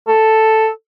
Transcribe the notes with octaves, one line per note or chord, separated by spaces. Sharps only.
A4